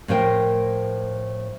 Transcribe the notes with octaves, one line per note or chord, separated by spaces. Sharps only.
A2 F3 A#4 C5 G5